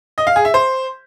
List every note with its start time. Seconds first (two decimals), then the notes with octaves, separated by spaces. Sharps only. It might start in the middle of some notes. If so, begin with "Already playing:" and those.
0.18 D#5
0.27 F5
0.36 G#4
0.45 E5
0.54 C5